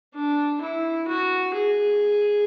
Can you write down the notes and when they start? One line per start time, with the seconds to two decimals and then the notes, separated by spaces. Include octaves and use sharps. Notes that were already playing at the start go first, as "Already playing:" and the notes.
0.15 D4
0.61 E4
1.07 F#4
1.54 G#4